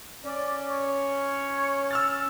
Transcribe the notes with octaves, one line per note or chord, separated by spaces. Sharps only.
C#4 D5
C#5
E6 F6 A6